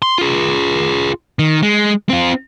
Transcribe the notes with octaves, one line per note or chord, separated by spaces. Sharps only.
C6
F4 G#4
D#3
G#3
C4 F4